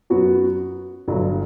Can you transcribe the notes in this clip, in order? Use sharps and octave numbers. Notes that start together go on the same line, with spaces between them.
F#2 F#3 B3 F#4
G1 G2 F#3 A3